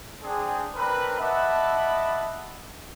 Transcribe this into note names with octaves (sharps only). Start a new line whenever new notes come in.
C4 D4 G#4
C4 D4 A#4 B4
D#5 E5 F#5 A5 B5 D6